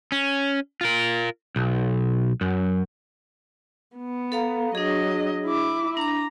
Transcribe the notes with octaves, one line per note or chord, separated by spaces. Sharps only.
C#4
F4 A#4
B1
F#2
B3
A4 F5 A#5
F#3 D4 G#4 D#5
E4 D6
D4 A#5 D6